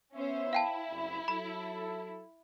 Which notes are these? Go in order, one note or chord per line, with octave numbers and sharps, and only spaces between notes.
B3 C#4 C5 E5
E4 F5 G5 A5
F#1 C2
F#3 A4 B5